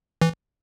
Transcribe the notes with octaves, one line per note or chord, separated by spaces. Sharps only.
E3